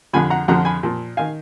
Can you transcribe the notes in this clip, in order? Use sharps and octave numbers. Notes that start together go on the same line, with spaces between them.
F2 D3 F3 G#5 B5
F#5 A#5
F2 D3 F3 F#5 A#5
G#5 B5
A#2 F3
D#3 F5 G#5